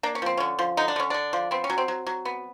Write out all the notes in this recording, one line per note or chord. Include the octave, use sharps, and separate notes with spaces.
A#3 D4
C#4
F3 C4
D3 C#4
F3
D3 D#4
D4
D3 C#4
D3 D4
F3
B3 C4
C#4
F#3
C4
F#3
F#3
B3